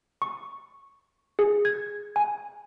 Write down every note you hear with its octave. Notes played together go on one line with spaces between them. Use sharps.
C#6
G#4
G#6
G#5